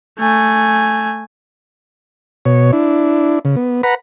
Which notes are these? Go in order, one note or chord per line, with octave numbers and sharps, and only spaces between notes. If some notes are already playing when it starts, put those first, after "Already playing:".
A3 G#5
B2 C#5
D4 E4
C#3
B3
B4 F#5 A#5 B5